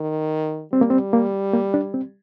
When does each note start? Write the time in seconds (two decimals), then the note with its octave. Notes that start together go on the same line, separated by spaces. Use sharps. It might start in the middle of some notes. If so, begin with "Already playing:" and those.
Already playing: D#3
0.73 G3 C4
0.81 A#3
0.90 C4
1.13 A#3
1.54 A#3
1.74 D4
1.94 C4